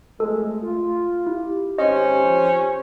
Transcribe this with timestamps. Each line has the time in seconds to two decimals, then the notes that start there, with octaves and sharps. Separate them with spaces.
0.20 F2 G#3 A3 A4
0.63 F4
1.27 E4 G4
1.78 G#1 C#4 C5 D#5
2.24 F3